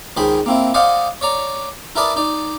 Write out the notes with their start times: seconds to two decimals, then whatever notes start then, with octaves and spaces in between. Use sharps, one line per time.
0.17 C#2 D#3 G#4 C5 B5
0.46 A#3 C4 E4
0.74 C5 D5 D#5 F5 F#5 G#5
1.21 C#5 D5 A#5
1.96 E4 A#4 B4 D5 A5 D#6
2.16 D#4 D5